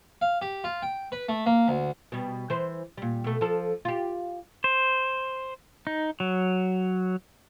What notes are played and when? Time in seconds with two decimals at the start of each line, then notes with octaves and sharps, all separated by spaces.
0.21 F5
0.42 G4
0.64 F4
0.83 G5
1.12 B4
1.29 A3
1.46 A#3
1.68 D2
2.12 B2 G3
2.50 E3 C5
2.98 A#2 G3
3.24 B2 A3
3.41 F3 A4
3.85 F4 G4
4.64 C5
5.87 D#4
6.20 F#3